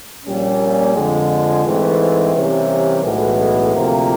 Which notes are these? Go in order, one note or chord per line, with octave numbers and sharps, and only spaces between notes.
A#1 A#2 G3 A#3 C#4
F2 D3 F3 G#3
G#2 E3 A3 C4
C3 E3 G3 A#3 C#4
B1 A2 E3 G#3 B3
D2 C3 F3 A#3